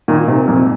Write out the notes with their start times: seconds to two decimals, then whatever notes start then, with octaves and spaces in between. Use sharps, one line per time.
0.08 A#2 D#3
0.28 G#2 C3
0.48 F2 A#2